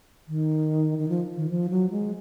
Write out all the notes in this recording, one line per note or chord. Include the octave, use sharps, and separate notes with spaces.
D#3
D#3
F3
D#3
F3
F#3
G#3